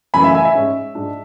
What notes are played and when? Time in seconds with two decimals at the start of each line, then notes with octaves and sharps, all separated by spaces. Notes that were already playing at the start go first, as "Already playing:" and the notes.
0.14 F#2 E3 A3 G#5 B5
0.24 E5 G#5
0.34 E5 G#5
0.45 E5
0.55 G#2 G#3 C#4
0.95 G#2 G#3 D4